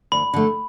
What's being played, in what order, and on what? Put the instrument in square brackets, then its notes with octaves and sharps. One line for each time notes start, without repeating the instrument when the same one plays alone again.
[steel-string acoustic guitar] D2 [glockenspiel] B5
[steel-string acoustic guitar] D3 A3